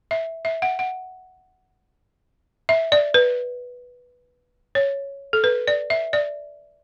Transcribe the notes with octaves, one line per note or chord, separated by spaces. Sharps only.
E5
E5
F#5
F#5
E5
D5
B4
C#5
A4
B4
D5
E5
D5